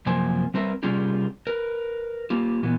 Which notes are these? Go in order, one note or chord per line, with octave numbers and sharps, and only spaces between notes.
F#2 C3 F3 A#3 C5 G#5
G3 C4 A#4 B4 E5
C3 G3 C#4 F4 G4 G#4
A#4 B4
A#3 F4 G4
A#2 E3 B3